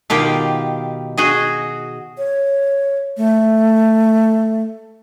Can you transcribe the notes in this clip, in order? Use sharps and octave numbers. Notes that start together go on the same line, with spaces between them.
B2 D#3 F4 G4
F#4 G#4 D#5
C#5
A3